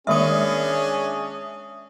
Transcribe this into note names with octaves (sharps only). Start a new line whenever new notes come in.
D#3 G#3 A#3 C#4 D4 G#4 E5 D#6